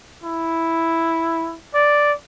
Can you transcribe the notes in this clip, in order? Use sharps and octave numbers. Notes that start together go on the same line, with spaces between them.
E4
D5